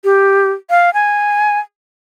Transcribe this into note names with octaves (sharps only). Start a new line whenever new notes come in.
G4
F5
G#5